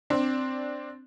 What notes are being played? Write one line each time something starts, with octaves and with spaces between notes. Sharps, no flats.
C4 D4